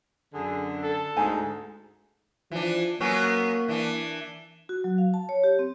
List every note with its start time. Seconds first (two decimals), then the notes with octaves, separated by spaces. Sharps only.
0.34 F#2 D3 G#4
0.83 A4
1.17 D2 G#2 G#4 G#5
2.52 E3 F3 D4
3.00 F#3 A#3 B3 C#4
3.68 E3 D4
4.69 F#4
4.84 F#3
4.98 F5
5.14 A5
5.29 C#5
5.44 G4
5.59 C4